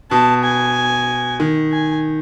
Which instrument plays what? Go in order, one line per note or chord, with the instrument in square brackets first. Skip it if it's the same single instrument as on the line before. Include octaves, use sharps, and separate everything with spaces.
[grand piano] B2 [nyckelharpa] A5
[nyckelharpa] G#5
[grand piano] D#3
[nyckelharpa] G#5